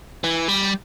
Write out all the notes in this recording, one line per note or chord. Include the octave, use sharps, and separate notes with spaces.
E3
G3